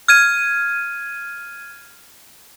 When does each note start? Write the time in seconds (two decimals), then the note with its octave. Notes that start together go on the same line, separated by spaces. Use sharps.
0.08 F6 G#6 D#7